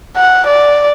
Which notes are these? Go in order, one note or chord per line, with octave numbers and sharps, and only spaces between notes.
F#5
D5